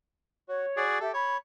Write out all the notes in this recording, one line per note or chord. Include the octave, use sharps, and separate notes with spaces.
F#4 C#5
F#4 G#4 D5
G4 A4 E5
C#5 B5